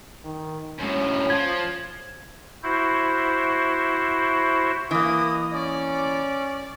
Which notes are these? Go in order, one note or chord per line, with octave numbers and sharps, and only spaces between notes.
D#3
F#2 A2 C#4
F3 G#6
E4 F#4 C5
E3 A#3 D#5 D#6
C#4 D5